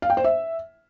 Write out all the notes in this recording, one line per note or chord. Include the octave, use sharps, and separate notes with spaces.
F5
G5
C5
E5